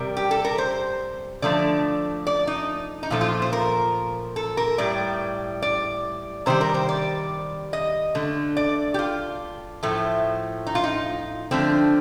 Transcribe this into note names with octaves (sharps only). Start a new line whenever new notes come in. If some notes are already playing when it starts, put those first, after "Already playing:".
Already playing: C3 G3 A#4
G4
A4
A#4
C5
D3 F3 A3 D5
D5
D#4
D#4
A#2 F3 A3 F4
F4
C5
A#4
A4
A#4
A2 G3 D5
D5
C3 D#3 G3 C5
A#4
C5
D5
D#5
D3 A3
D5
G4
F4
A2 F3 A3
D#4
F4
D#4
D3 F3 A3 C4